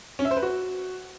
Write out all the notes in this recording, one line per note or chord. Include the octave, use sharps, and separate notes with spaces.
C#4
E5
C5
B4
F#4